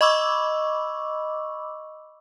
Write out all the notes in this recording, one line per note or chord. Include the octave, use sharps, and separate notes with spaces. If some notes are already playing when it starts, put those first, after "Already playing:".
D#5 B5 C#6 D6 E6